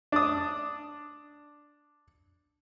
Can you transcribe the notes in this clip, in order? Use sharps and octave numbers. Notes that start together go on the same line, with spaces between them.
D4 D#6